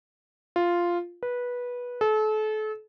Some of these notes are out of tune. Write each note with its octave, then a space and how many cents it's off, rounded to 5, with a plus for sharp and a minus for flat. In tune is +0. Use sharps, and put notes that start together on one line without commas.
F4 -5
B4 -15
A4 -35